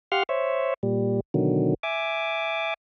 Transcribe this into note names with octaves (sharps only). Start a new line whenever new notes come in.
G4 F5 F#5 C6 F6
C5 C#5 E5
A#2 G3
B2 D3 D#3 F#3
E5 G#5 D6